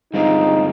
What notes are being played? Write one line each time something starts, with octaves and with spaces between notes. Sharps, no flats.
G2 D3 G#3 C4 D#4 F4